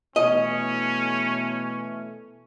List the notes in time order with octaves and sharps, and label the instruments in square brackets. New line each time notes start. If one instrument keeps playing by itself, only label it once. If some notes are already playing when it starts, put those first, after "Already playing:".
[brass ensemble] B2 E3 A3 [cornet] C#4 [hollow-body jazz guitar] D#5